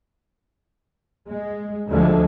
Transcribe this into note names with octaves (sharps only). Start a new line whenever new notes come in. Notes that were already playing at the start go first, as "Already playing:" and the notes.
G#3
D2 D3 F3 G#3 A3